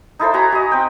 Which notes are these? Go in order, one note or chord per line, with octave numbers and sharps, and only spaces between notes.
D#4 E4 A4 C5
F#4 G#5 A#5 B5
F#4 D#5
C4 G5